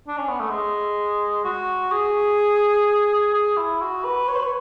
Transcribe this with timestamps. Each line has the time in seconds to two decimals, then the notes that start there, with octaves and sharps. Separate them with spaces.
0.07 D4
0.17 C#4
0.28 B3
0.40 A3
0.50 G#3
1.44 F#4
1.92 G#4
3.34 G#4
3.57 E4
3.81 F#4
4.04 B4
4.28 C#5
4.36 B4
4.43 C#5